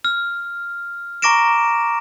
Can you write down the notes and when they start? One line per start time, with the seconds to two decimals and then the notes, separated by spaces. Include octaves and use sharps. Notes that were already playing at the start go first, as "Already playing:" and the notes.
0.05 F6
1.22 A#5 C#6 D6 A#6 D7 E7